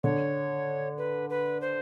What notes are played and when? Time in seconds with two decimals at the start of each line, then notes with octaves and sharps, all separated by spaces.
0.03 D3 C#5
0.98 B4
1.30 B4
1.61 C5